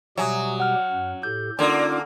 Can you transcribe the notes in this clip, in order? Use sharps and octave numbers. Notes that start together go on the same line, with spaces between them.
B2 F#3 G3 G4 E5 G#5 D#6
F#5 F6
F#2
A2 G4 A4 G6
D3 A#3 C#4 D#4 F4 D5 D6 E6